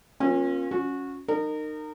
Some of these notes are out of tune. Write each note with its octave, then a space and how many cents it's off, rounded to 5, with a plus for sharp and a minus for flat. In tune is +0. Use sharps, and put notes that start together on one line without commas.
A#3 +20 C#4 -35 F4 +20
C#4 +0 F#4 -20
D#4 -25 A#4 -25